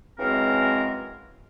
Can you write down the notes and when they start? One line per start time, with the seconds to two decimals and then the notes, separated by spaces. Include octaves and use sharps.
0.17 F#2 C#3 E3 G#3 C4 A#4